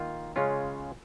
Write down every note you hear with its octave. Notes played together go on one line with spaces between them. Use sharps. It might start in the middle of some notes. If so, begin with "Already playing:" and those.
Already playing: D#3 A#3 F4
C#3 G#3 C#4 F4